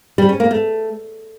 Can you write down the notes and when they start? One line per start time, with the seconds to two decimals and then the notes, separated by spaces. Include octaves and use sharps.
0.18 G3
0.29 C#4
0.40 A#3
0.51 A3